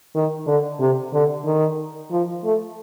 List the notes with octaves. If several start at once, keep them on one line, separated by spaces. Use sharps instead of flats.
D#3
D3
C3
D3
D#3
F3
A3